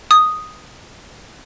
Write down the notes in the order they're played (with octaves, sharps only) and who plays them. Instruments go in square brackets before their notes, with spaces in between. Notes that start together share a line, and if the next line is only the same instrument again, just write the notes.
[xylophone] D#6